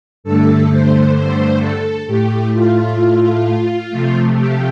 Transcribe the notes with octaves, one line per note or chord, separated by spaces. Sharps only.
G2 D3 A3 A4
C5
C5
A4
A2 A3 G4
F4
C3 F3 A3
G4